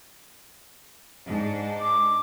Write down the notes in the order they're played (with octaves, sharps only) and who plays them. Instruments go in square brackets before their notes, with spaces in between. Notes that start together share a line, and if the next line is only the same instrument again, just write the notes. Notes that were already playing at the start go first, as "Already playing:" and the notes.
[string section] G#2 D4
[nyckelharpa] D6